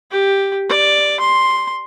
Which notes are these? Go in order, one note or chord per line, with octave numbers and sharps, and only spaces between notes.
G4
D5
C6